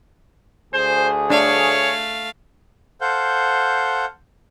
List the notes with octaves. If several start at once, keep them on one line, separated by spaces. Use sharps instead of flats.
D2 G#4 C5
A3 D4 C#5 F5
A4 C5 F5 F#5 G6